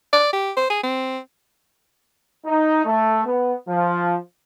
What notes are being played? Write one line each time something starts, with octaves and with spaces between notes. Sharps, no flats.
D5
G4
C5
G#4
C4
D#4
A3
B3
F3